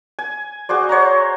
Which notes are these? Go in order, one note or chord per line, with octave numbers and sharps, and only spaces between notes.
G#5
F#4 G#4 C5 D5
C5 C#5 F#5 A#5